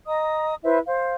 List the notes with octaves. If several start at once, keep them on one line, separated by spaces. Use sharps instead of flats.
D#5 A#5 D#6
E4 B4 C5 E5
C5 F5